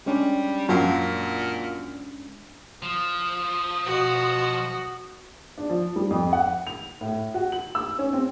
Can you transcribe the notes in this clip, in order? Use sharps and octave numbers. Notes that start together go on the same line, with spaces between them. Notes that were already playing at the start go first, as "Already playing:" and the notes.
G3 G#3 C#4 D4
F#2 A#2 F3
F3 D#6
B2 F#4
D4
F3
G3
F2
F#5
F7
A2
F#4
F#7
E6
C#4
C4